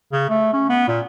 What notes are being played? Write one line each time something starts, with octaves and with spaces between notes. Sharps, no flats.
C#3
A3
C#4
B3
A#2